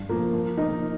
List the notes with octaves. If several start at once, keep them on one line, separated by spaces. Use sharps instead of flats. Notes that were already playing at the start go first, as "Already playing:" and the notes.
Already playing: G2
F3 A#3
F3
A#3 D#4 A#4